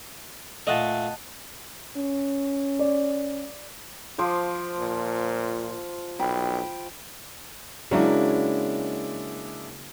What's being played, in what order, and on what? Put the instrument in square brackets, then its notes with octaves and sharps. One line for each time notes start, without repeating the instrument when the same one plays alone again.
[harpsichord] A#2 A3 [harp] D#5 F#5 A5
[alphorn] C#4
[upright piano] D5
[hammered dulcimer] F3 C5 D6
[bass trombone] A#2
[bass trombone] B1 [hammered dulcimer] G5 B5
[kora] C#3 F#3 A#3 [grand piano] G#3 D4 E4